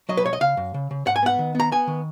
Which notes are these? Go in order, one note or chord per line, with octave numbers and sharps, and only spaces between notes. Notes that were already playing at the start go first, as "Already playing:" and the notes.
F#3 D#5
B4
B1 C#5
D#5
C#3 F5
F#2
C#3
C#3
G#2 F#5
G#5
B3 F#5
D#3
B3 A#5
B3 G#5
D#3